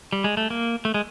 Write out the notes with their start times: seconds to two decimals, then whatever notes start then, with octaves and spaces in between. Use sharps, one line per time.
0.12 G3
0.24 G#3
0.37 A3
0.50 A#3
0.85 A3
0.94 G#3